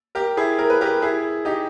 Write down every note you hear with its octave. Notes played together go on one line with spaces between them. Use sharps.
G4 A#4
E4 G#4
A#4
B4
G4 A#4
E4 G#4
D#4 G4